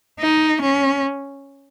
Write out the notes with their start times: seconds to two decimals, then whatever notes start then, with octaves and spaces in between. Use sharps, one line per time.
0.20 D#4
0.62 C#4